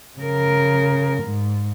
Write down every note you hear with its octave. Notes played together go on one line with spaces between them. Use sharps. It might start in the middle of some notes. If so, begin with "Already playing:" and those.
C#3 A#4
G#2